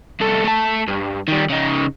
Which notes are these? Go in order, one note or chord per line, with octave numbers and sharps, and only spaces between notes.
C2 A4
A3 A5
G2
D#3 G3
C#3 D#4